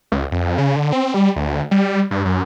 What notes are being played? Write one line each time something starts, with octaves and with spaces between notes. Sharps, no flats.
C#2
F2
C#3
D3
C4
G3
D2
G3
G2
F#2